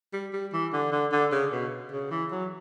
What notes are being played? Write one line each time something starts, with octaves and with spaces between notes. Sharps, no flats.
G3
G3
E3
D3
D3
D3
C#3
B2
C#3
E3
F#3